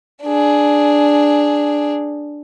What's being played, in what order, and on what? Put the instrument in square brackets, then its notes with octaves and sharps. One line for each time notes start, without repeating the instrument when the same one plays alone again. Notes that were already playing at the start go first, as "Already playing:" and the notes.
[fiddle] D4 G#4